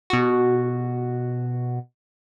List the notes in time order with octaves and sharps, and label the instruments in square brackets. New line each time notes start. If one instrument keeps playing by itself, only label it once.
[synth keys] B2 F#4